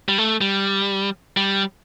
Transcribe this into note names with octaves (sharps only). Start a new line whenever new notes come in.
G3
A3
G3
G3